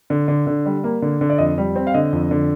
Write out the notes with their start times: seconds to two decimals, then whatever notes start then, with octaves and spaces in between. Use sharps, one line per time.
0.10 D3
0.28 D3
0.47 D3
0.66 G3
0.84 A#3
1.02 D3
1.21 D3
1.30 D5
1.38 F2 D#5
1.58 G3
1.76 C4
1.87 F5
1.94 D3 D#5
2.13 F2
2.31 D3